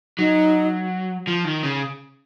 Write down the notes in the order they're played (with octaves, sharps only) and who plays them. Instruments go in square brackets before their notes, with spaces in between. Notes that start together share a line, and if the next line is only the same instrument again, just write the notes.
[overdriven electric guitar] F#3 [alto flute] D#4
[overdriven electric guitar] F3
D#3
C#3